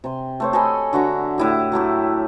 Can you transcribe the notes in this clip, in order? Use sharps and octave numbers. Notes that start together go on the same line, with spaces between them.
C3 C6
A3 C5 C#5
A4 D#5 G#5 B5
D3 F#4 E5 A#5
A2 E4 G4
F#3 A3 E4 G4